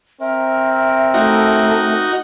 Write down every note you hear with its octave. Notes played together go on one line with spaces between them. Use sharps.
C4 A#4 E5
A3 D#4 F#4